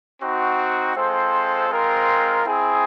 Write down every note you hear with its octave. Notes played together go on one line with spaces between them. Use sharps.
C4 D#4 F#4
G#3 C4 F4 A4 C5
G#3 C4 F4 A#4
C4 E4 G#4